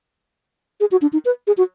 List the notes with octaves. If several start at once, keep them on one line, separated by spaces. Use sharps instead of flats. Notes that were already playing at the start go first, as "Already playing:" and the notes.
G#4
F#4
D4
D#4
B4
G#4
F#4